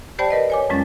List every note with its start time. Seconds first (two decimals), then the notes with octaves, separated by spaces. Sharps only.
0.19 G4 C5 D5 G5 A5 B5
0.31 A#4 B4 D#5
0.50 C#5 G#5 D6
0.69 F2 F#3 G#3 C#4 A6